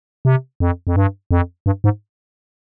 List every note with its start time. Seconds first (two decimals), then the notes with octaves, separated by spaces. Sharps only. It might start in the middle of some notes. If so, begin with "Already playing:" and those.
0.25 C3
0.60 F2
0.87 F2
0.96 G2
1.31 F2
1.66 G2
1.84 G#2